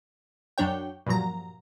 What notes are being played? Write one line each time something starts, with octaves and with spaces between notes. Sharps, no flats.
F#2 F#3 D4 C#5 G5
G2 A#2 F3 F#3 A#5